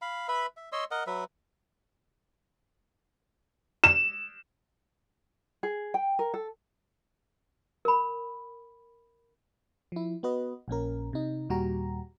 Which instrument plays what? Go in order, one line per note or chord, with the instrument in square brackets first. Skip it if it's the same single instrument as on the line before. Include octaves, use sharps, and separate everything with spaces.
[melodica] F5 B5
B4 E5 B5
E5
C#5 D#5 C6 E6
A#4 D#5 F#5
F#3 B4 E5
[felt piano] E7
[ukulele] G#4
G5
A#4
A4
[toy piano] A#4 B5
[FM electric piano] F3 E4
B3 F#4 B4 D#5
A#1 A#2 C#4 A#4
C3 D#4
D#2 A#2 G3 F#4 G4 A#5